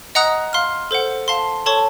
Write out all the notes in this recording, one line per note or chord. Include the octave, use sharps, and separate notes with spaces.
D#5 F#5 A#5 D#6 F#6
F5 C6 F6
A4 C5 F#5
F5 A5 C6
A4 C#5 A5 C#6